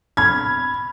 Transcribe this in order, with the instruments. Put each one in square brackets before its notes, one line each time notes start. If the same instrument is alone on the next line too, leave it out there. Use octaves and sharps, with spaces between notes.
[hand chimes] B5 F6 [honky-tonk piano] G#6